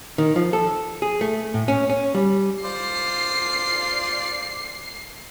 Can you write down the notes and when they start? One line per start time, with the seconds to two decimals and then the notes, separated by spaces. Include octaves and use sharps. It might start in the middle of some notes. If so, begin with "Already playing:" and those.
0.18 D#3
0.36 F3
0.53 A4
1.02 G#4
1.21 A3
1.54 A2
1.68 C#4
1.90 C#4
2.15 G3
2.64 F4 C5 D5 C7